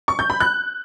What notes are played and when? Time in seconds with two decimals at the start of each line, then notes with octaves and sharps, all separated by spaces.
0.08 C#6
0.19 G6
0.30 B5
0.40 F#6